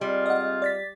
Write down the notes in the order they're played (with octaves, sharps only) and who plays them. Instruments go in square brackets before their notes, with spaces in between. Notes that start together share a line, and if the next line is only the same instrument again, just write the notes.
[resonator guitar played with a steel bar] G3 [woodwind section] G#3 C4 F4
[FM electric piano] D#5 F#5
D5 A6 B6